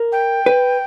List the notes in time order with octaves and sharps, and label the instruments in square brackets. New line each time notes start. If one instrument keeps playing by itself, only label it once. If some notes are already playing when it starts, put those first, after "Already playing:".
Already playing: [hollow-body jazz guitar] A#4
[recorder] G5
[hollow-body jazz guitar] B4